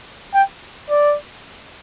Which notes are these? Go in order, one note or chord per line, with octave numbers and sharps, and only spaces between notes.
G5
D5